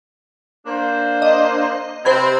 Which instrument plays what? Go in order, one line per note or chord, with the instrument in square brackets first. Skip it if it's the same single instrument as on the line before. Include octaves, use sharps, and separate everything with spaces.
[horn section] A#3 D4 C5
[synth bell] D#5
[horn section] C3 C4 [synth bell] C5 B5 G#6